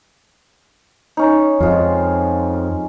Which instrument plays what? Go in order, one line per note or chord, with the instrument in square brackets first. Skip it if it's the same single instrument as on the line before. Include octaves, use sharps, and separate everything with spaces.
[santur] C#4 D#4
[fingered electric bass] F2 [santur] G#3 F4